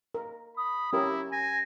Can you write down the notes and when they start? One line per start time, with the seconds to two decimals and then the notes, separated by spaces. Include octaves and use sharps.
0.15 A#4
0.57 B5 D#6
0.93 C#4 E4 G4 A#4
1.32 G#5 A#6